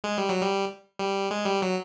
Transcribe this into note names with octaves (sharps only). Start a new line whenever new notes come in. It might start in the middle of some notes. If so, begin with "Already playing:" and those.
G#3
G3
F#3
G3
G3
G#3
G3
F#3